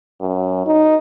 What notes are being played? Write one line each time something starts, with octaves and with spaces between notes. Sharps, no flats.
F#2
D#4